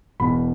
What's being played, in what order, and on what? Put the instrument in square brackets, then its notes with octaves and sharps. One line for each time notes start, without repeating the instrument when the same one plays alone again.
[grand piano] E1 E2 B2 B5